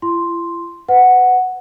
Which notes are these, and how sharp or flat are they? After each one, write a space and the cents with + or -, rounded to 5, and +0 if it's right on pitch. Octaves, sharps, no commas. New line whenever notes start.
E4 +45 C6 +0
B4 +30 F#5 +0